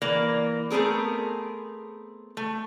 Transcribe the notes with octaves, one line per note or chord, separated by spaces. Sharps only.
E3 A#3 D5
A3 B3 C4 G#4 A#4
A3